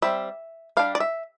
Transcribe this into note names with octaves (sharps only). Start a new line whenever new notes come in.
G3 C4 E5
G3 D4 F5
D5
E5